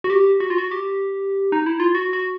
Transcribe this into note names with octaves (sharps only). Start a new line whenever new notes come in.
F#4
G4
F#4
F4
F#4
G4
D#4
E4
F4
F#4
F#4